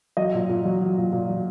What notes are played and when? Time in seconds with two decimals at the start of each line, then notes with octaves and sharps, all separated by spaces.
0.17 F#3 D#5
0.34 A#2
0.49 A#2
0.65 F#3
0.81 F#3
0.97 A#2
1.12 A#2
1.29 F#3